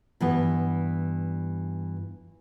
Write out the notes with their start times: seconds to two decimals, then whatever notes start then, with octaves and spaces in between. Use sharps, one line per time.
0.20 G2 E3 B3